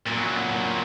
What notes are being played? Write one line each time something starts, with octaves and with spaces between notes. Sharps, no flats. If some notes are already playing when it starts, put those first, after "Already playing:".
A#2 F#3